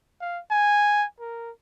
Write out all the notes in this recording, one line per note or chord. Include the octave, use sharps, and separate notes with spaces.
F5
G#5
A#4